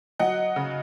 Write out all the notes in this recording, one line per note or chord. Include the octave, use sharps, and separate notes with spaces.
F#3 D#5 F#5
C#3